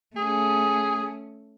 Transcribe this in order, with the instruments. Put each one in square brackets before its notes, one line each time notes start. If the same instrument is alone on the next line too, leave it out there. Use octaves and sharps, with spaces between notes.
[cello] A3 C#4 [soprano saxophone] G#4 [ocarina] D#6